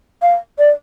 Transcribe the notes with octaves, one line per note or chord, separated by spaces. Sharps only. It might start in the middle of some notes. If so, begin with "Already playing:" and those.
F5
D5